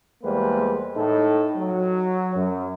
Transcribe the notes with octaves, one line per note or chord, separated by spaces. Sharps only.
E2 G3 G#3 A#3 B4 C5
A2 D#4 A4
F#3
F#2